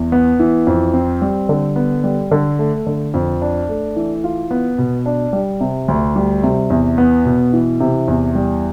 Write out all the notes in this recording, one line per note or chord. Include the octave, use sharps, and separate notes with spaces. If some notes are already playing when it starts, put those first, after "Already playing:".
Already playing: E2
B3
E3
F2
C4
G3
D3
B3
G3
D3
A3
D3
F2
D4
A3
E3
F4
B3
B2
D4
G3
C3
D2
G3
C3
E2
B3
B2
E3
C3
E2
G3